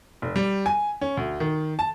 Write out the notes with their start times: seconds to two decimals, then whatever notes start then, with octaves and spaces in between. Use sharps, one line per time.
0.22 F1
0.36 G3
0.66 G#5
1.01 C#4
1.17 D2
1.40 D#3
1.79 A5